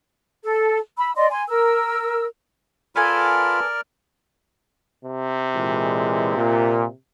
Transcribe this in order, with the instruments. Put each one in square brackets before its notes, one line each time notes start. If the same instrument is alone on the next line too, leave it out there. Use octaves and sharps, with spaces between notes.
[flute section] A4
B5 E6
D5 D#5 C6
G#5 C6
A#4 E6
[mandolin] B3 A4 G#5 [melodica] F4 B5 [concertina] A#4 D5 F6
[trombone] C3
[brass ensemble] A#2 E3 G#3
A#2